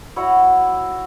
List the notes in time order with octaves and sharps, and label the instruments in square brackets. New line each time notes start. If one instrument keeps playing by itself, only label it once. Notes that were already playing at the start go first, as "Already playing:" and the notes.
[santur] E4 F#4 C#5 F#5